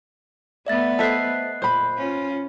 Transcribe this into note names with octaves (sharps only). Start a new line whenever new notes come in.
A3 B3 D5 E5 A6
A4 C5 D#5 E5 F#6 C7
A#2 C5 B5
C#4 F4